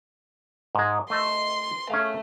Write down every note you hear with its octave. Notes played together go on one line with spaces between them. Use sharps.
G#2 G#3
A3 D#5 A5 C6
A3 C#4 G#4 F5